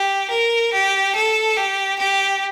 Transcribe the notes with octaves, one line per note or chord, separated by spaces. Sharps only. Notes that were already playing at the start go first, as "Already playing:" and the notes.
Already playing: G4
A#4
G4
A4
G4
G4